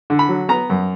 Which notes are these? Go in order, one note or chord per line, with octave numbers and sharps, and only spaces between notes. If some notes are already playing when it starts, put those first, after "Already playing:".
D3
B5
F#3
B3 A#5
F#2